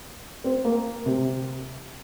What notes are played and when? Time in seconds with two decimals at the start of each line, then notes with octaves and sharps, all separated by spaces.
0.44 C4
0.65 A#3
1.06 C3